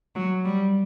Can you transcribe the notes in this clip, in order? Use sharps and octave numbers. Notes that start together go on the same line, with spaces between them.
F#3
G3